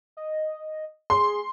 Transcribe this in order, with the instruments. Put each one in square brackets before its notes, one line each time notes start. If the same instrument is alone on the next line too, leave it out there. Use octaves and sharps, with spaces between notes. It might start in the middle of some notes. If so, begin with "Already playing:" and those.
[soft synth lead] D#5
[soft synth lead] G#4 [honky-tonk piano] C6